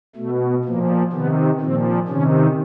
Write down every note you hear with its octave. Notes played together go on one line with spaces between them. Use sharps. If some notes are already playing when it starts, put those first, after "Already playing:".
B2 A3
A#2 F3 A#3
C3 D#3 B3
A#2 F3 C4
C3 D#3 C#4